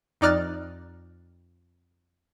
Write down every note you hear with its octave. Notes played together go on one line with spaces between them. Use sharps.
F2 D#4 D5 F6 F#6 A6